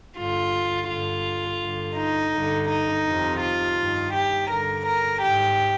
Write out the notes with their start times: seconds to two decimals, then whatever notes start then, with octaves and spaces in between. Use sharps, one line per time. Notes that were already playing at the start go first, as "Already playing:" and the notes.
0.17 G2 D3 F4
0.89 G2 D3 F4
1.62 G2 D3
1.98 D#4
2.34 G2 D3
2.70 D#4
3.06 F2 C3 D#3
3.42 F4
3.79 G2 D#3
4.15 G4
4.51 G2 D3 A#4
4.87 A#4
5.23 G#2 D#3 G4